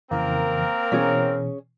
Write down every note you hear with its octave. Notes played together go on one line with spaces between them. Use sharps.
F2 C#3 E3 A#3 C4 A#4
B2 E3 C#4 G#4 C#5